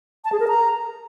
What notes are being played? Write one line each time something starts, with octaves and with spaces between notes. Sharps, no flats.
A5
G#4
A#4
A#5